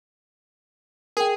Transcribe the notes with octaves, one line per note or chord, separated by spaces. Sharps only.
G#4 A#4 G5